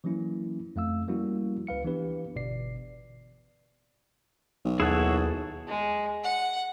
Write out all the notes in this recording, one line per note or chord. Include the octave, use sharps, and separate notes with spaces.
E3 F#3 A#3 C#4 E4
F2 A3 F5 E6
F3 G3 A#3 C#4 E4 F#4
C#2 B4 F5 C#7
E3 B3 D4 G4 B4
G1 B2 D5 C7
B1
D#2 E4 F#4 G#4 A4 C#5
G#3
F#5